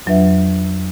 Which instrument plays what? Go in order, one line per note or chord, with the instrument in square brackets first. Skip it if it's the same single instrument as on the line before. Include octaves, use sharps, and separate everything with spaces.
[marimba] F2 F#3 D4 B4 E5